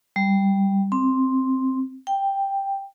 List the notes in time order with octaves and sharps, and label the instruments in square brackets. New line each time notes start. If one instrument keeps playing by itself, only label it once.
[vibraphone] G3
C4
G5